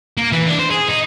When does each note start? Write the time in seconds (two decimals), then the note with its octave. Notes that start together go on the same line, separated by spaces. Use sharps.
0.18 A#3
0.32 E3
0.46 D4
0.59 C5
0.71 G#4
0.88 D#4